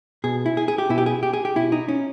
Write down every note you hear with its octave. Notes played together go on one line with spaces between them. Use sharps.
B2 G#4
E4
G#4
G#4
G4
B2 E4
G4
G#4
G4
G#4
G4
B2 E4
D#4
C#4